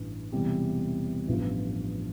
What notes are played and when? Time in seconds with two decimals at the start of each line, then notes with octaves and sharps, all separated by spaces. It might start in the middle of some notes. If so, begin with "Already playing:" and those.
Already playing: A1 G2 E3
0.32 E1 E2 C3 E3 G3
1.28 A1 G2 F3 B3 F4